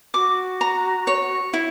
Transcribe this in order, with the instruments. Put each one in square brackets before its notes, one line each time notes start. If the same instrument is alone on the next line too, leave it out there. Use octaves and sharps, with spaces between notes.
[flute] F#4 [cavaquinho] D6
[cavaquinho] A#5
C#5
E4